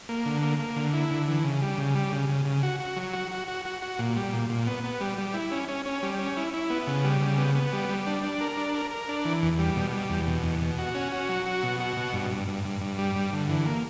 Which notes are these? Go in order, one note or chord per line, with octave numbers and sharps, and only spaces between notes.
A#3
D3
A#3
A#3
D3
E4
D3
E3
C#3
G3
C#3
G3
C#3
C#3
C#3
F#4
F#4
F#3
F#4
F#4
F#4
F#4
F#4
A#2
G3
A#2
A#2
B3
B3
G3
G3
E4
C#4
C#4
C#4
G3
C#4
E4
E4
B3
C#3
G3
C#3
B3
B3
G3
G3
D4
D4
A#4
D4
A#4
A#4
D4
E3
E2
G3
B2
G3
E2
B2
E2
B2
F#4
C#4
F#4
F#3
F#4
B2
F#4
B2
G2
G2
G2
G2
G2
G3
G2
D3
E3
A#3